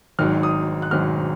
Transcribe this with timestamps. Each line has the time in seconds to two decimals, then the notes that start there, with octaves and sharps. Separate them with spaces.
0.19 G#1 G#2 D#3 F#3 F6
0.43 D#6
0.82 F#6
0.91 G#1 G#2 D#3 F#3 F6